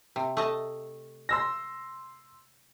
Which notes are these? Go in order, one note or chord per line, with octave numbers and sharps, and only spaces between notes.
C3
A3 D#5 A5
C6 E6 A#6